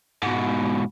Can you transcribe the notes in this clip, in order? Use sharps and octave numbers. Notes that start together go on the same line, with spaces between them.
G#2 B2